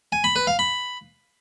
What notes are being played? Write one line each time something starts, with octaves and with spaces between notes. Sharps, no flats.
G#5
B5
B4
F5
B5